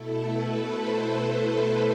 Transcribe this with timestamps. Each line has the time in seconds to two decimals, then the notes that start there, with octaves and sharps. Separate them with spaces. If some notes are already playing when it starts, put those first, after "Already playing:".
Already playing: B2 A3 E4 A4
0.29 B4
0.68 C5